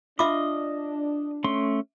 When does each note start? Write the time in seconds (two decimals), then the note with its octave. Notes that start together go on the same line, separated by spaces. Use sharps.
0.19 D4 F4 D#5 E5 B5 D6
1.44 A3 C#4 C6